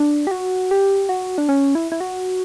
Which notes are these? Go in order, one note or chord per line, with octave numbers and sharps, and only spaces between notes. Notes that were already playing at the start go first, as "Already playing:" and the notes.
Already playing: D4
G4
F#4
G4
F#4
D4
C#4
E4
E4
F#4